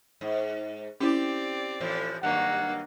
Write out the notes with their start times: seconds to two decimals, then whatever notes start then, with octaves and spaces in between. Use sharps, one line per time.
0.21 G#2
1.01 C4 C#4 E4 G4 D5
1.81 A2 E3 F3
2.23 G2 D#3 F#3 A#3 F#5